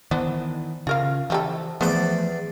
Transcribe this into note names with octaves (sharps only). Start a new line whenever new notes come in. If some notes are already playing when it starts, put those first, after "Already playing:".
D#3 E3 B3 D4 C5
C#3 F4 A#4 F5
E3 F3 G3 A4
E2 F3 A3 B3 C5 D5